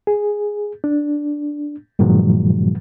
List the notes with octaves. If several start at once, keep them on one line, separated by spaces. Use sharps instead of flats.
G#4
D4
G2 A#2 D#3 F3 F#3 G#3